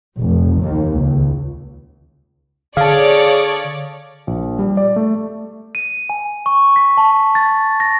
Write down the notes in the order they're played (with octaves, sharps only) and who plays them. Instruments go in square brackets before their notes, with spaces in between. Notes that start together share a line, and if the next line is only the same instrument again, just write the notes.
[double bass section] F1
D#2
C#2
[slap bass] D3 [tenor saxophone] G#4 [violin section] C#5 D5 [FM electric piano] F5 A5
[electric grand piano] A#1
G3
D5
A3
[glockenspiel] D#7
G#5
C#6
B6
A5
A6
A#6